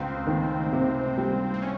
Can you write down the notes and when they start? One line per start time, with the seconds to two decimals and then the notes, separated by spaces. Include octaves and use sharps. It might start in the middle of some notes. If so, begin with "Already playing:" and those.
Already playing: C#2 C4
0.27 D#3
0.73 C3
1.18 G3
1.54 C4
1.62 C#4